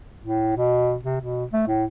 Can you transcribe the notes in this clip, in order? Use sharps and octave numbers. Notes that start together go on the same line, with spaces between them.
A2
B2
C3
B2
A3
A2